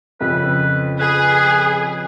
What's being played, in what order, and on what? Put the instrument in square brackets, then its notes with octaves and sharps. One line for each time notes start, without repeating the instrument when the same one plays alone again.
[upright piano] F2 C#3 [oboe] B4
[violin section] G#4 [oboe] B4